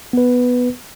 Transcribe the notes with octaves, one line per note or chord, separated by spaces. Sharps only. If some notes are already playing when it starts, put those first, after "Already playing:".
B3 B4